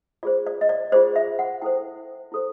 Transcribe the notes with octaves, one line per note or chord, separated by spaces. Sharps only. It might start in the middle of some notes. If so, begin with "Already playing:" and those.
F4 G#4 C5 D5
D5
D#5
D5
F4 G#4 C5 D5
E5
F#5
E4 A4 C5 G5
E4 A4 C5